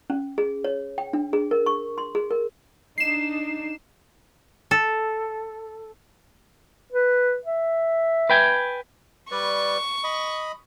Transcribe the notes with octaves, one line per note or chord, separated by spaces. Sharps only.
C#4
G#4
C#5
G5
D4
G#4
A#4
C#6
C6
G#4
A#4
D4 D#4 C7 E7
A4
B4
E5
B4 G5 G#5
G3 B4 D5 C#6
D#5 B5